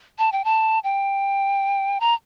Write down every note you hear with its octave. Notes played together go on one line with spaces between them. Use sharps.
A5
G5
A5
G5
A#5